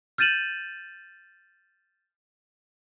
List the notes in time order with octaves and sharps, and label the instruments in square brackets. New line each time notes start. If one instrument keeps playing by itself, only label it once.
[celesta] F6 G6 A6 D#7 E7 F#7